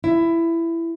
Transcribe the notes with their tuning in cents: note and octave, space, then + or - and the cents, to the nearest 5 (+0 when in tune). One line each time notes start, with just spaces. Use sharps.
E4 +15